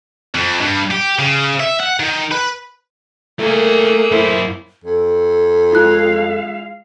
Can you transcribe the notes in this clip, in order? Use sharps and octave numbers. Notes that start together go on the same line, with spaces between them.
F2
G2
G4
C#3
E5
F#5
D#3
B4
A3 A#3 E4 G#4 A#4
F#2 E4 C5
F2 A4
G#3 E4 F4 F5 F#6